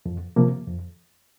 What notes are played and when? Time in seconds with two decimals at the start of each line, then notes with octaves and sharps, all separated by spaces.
0.06 F2
0.36 C3 F3 A#3
0.67 F2